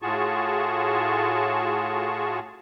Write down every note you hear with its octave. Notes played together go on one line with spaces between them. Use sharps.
A2 F4 F#4 G#4 A5 C#6